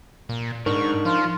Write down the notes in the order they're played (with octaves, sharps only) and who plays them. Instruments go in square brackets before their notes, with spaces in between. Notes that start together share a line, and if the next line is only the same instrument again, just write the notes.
[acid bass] A#2
[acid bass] G#2 [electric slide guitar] D4 D#4 A#4 [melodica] C#6
[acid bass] F3 [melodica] F4